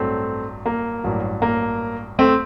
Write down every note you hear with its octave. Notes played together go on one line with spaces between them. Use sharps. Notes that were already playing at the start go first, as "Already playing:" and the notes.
Already playing: A1 G2 F#3 A3 C4
A#3
A1 G2 F#3
A#3
A3 C4